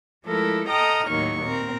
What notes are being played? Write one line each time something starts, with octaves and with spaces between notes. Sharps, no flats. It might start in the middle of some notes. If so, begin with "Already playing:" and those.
F3 G#3 A3 E4 A4 A#4
A4 D#5 G5 A#5 D#6 F6
D#2 A2 F#3 D#4 C#6
A#2 C4 A#4